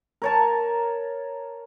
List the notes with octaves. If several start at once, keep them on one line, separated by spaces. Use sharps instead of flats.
A#4 C#5 A5